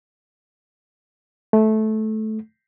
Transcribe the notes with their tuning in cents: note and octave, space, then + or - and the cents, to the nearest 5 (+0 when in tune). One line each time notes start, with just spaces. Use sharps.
A3 -15